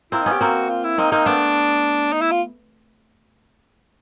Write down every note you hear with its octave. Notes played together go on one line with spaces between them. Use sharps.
A#3 C4 E4
B3 C#4 D#4
G4
A#3 C4 F#4
F4
E4
A#3 C4 D#4
A#3 C4 D#4
A3 B3 D4
D#4
E4
F4